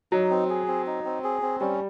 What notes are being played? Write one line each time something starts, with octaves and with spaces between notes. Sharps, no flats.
F#3 D#4
C4
G#4
C4
D#4
C4
G#4
C4
G3 C#4